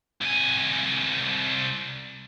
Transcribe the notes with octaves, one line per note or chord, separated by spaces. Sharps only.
C2 G#5